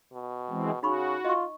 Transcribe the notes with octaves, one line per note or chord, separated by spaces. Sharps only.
B2
E3 G#3 C4
C#3 D#4 F#4 B5 C#6
F4 D#5 C#6